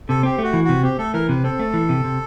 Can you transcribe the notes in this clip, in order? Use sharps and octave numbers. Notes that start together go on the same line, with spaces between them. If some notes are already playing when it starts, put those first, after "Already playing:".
C3 A4
C4 G4
A3 F#4
E3
C3 F#4
C4 G4
A3 A4
E3 A#4
C3 B4
C4 A4
A3
E3
C3
C3